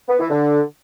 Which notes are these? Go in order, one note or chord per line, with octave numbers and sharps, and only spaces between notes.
B3
E3
D3